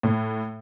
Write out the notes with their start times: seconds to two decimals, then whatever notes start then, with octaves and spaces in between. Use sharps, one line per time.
0.03 A2